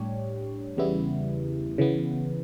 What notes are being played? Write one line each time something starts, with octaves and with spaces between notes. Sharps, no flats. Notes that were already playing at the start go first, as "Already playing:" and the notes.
Already playing: A2 G3 D4 G4 C#5
E2 C#3 G3 B3 E4
C#3 E3 B3